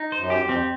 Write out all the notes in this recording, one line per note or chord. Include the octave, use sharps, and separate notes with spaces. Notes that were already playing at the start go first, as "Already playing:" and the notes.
Already playing: D#4
C5
F#2
G4
F2
C4